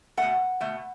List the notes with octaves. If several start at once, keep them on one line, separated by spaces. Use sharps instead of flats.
B2 A3 F#5
B2 A3